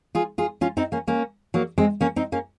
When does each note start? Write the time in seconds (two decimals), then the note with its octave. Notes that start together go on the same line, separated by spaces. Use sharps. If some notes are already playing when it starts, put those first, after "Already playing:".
0.15 F4 G#4
0.38 F4 G#4
0.61 C#4 F4
0.77 C4 D#4
0.92 A#3 C#4
1.07 A#3 C#4
1.54 F#3 A#3
1.78 G#3 C4
2.01 A#3 C#4
2.16 C4 D#4
2.32 A#3 C#4